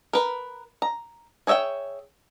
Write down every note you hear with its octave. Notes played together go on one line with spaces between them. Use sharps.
A#4 B4
A#5
G#4 C#5 E5 F#5 G5